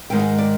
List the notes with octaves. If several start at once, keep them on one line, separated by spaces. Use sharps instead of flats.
G#2 D#3 G#3 G5
G#5
D5